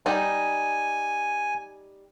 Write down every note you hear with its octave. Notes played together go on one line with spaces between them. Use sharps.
G3 D#4 G#5